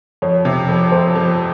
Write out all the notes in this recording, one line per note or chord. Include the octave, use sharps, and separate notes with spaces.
F2 C#5
C3
F2
F2 C5
F2